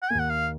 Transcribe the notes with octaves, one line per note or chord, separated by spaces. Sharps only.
F#5
D#2 D#3 A#3 G#5
F#5
F5